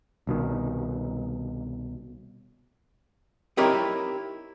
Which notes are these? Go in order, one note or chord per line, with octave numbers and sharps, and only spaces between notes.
C2 B2 D#3
C4 D#4 E4 G4 A#4 C#5